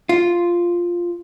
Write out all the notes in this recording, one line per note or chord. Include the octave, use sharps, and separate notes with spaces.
F4